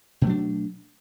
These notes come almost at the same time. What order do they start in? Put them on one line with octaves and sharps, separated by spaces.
B2 A3 F#3 D4